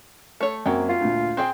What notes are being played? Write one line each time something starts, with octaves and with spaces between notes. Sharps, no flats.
A3 C#5
F#2 F#3 A#3 C4 G5
F4
D2 A#2
C4 G#4 G5 G6